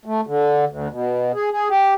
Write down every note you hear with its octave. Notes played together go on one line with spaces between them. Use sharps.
A3
D3
D2
B2
G#4
G#4
G4